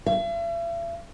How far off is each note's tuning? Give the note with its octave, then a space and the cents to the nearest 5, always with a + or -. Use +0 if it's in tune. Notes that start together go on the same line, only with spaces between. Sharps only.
E5 +45